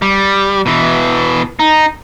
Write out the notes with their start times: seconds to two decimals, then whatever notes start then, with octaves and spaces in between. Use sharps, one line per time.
0.02 G3
0.66 B2 E3
1.59 D#4